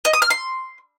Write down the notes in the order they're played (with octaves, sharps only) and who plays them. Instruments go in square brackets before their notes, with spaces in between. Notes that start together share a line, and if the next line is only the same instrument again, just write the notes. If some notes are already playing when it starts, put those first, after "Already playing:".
[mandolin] D#5
D#6
F6
C6